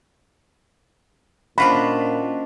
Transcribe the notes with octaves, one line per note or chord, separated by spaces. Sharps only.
A#2 C#4 D4 F4 F#4 C5 D#5 B5